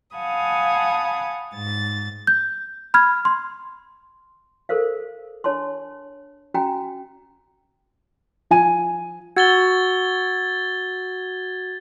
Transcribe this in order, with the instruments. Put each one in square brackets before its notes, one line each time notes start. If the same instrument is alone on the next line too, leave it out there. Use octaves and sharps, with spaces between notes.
[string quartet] F5 F#5 G#5 A5 B5 D#6
G#2 A6
[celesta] G6
B5 F6 G#6
C6
[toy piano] A4 A#4 C5 F5
D4 C#5 A5 C6
C#4 F#4 G5 G#5 A#5
[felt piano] F3 G#5 D#7
[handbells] F#4 F#5 E6 [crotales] G#6 A6 G7